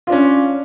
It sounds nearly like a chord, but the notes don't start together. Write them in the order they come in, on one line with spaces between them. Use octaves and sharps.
F4 D4 C#4